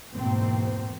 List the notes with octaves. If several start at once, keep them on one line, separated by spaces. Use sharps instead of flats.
E2 G#2 B2 A#3 C4